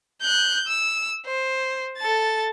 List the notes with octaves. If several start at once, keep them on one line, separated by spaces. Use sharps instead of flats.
F#6 G6
E6
C5
A4 A6